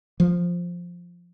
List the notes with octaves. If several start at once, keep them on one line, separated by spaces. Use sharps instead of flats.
F3